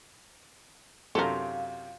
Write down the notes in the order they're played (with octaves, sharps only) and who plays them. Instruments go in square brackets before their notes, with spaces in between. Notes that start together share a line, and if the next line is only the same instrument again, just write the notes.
[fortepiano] F#2 C3 [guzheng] F4 [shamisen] A4 A#4